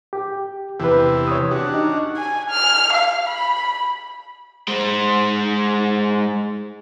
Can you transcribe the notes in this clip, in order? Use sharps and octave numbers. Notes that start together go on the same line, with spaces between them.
G4
E2 C3 E3 G4 B4
C#5 D#6
C#4 D4 F#4 G4
D#4
G#5
F6
F5
B5
G#3 C5